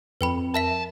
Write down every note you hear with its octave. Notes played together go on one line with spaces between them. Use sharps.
F2 B4 G5 B5
A#4 E5 A5 B6